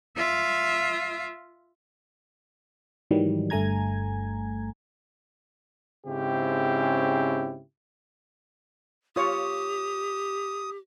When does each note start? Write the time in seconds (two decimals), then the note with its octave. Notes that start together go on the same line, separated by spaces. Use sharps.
0.17 F4 E5
3.11 G#2 D#3 E3 F#3 G3
3.50 G1 G2 A3 G#5 A#5 G#6
6.06 G#2 C#3 C4 C#4 E4 G4
9.16 F4 G4 C#5 D#6